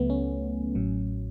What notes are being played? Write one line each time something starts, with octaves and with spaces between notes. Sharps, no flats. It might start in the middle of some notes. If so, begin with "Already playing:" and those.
Already playing: C#2 C#3 F#3 A3 B3
C#4
A1 A2 F#3